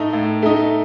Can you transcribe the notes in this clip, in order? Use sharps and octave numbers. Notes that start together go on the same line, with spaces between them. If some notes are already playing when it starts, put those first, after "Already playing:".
Already playing: A2 A3 D#4
A2
A3 D#4